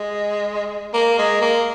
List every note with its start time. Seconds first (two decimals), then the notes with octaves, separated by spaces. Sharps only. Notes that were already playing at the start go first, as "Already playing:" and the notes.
Already playing: G#3
0.94 A#3
1.19 G#3
1.42 A#3